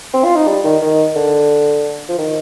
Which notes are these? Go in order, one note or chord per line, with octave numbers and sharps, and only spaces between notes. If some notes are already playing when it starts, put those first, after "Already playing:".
C4
F4
D#4
G3
D#3
D#3
D3
F3
D#3